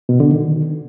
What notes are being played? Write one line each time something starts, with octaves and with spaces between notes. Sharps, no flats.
B2
D3
D#3